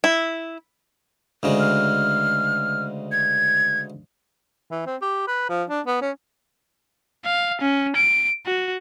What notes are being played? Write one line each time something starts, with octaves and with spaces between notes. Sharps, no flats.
E4
D2 C#3 G#3
F6
G#6
E3
C4
G4
B4
F3
D4
B3
C#4
F5
C#4
D7
F#4